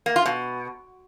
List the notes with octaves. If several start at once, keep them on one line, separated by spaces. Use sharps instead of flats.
A#3
F4
B2